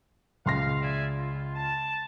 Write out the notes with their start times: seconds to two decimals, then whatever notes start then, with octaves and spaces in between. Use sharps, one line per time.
0.46 C#2 F5 C6 A#6
0.82 D5 E5 G#5
1.17 F4
1.55 A5